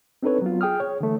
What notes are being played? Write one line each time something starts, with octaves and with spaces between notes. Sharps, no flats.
C4 D4 D#4 A4 B4 C#5
F#3 B3 F4
G#4 G5 D#6 F6
C#5
D3 E3 A3